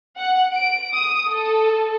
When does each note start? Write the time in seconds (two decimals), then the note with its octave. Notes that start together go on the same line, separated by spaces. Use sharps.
0.18 F#5
0.54 D7
0.93 D#6
1.28 A4